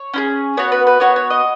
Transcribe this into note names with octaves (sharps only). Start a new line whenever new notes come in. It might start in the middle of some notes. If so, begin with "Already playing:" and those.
Already playing: C#5
C#4 E4 G#4
B3 F#4 C#5
B4
B4
B3 F#4 C#5
C#5
D#5